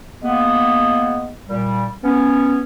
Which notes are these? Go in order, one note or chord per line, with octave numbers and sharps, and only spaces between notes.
G#3 A#3 B3
A#2 G3
B3 C#4